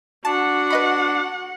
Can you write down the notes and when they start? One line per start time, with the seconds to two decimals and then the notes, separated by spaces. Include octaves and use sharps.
0.25 D4 F#4 F#5 A5
0.70 B4 D#5 B5